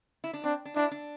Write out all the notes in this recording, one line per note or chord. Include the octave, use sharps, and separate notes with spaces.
E4
D4
C4 D4
D4
D4 E4
D4